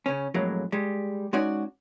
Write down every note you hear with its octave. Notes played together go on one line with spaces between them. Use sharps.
C#3 C#4
F2 A2 F#3 G#3 A#3
G3 G#3
G#3 C#4 D#4 F#4 C#5 D5